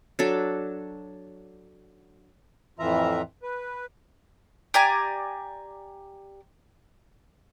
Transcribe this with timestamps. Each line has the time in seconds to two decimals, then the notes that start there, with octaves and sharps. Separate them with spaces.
0.19 F#3 D4 A4
2.79 F2 A2 E3 F4 E5 A#5
3.43 B4
4.74 G4 D5 G#5 A#5